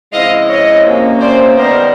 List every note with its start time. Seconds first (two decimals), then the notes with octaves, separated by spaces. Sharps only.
0.12 C#3 F3 G#3 C4 E4 D#5 F5
0.48 C#5 D#5
0.84 C3 F3 A#3 C#4
1.20 C5 D5
1.56 D#3 G3 B3 A#4 C5